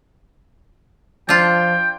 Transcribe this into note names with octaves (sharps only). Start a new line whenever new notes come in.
F3 D4 F4 G5